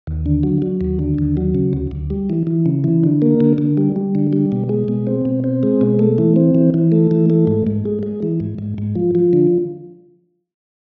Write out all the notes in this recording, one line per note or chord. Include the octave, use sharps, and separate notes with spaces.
D#2
D3
F#3
F#3
D#2
D3
D#2
F#3
C#3
D2
D2
G3
E3
E3
C#3
E3
D3
A#3
D3
D3
G3
G3
D3
G3
B2
G#3
B2
C4
B2
C4
G#3
B2
A3
E3
C4
E3
E3
A3
E3
A3
G#2
G#2
G#3
G#3
E3
G#2
G#2
G#2
F3
F3
D3